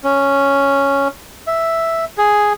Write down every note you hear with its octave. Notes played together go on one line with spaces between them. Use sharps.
C#4
E5
G#4